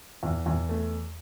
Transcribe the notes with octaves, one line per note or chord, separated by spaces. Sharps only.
E2
E2
A3